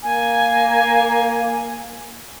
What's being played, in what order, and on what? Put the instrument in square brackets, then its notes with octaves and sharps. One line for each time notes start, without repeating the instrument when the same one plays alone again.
[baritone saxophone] A#3 [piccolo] G#5